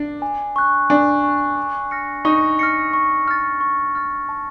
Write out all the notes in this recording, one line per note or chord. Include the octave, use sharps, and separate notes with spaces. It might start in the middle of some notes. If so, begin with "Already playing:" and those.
Already playing: D4
G#5
C#6 F#6
D4 G#5
C#6 F#6
C#6
F6 A#6 C#7
D#4 C#6
F6 A#6 C#7
C#6
F6 A6
C#6
F6 A6
A5